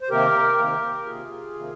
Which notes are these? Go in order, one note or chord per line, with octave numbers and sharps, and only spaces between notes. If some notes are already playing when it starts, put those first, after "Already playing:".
C5
C3 D#3 A#3 G4 A#4
C3 D#3 A#3
C3 D#3 A#3 F4 G#4
C3 D#3 A#3